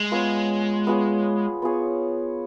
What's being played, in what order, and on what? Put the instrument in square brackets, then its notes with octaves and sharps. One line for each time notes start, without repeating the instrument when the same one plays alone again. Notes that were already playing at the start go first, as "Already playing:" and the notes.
Already playing: [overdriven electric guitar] G#3
[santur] B3 F4 G#4 C#5
B3 F4 G#4 C#5
B3 F4 G#4 C#5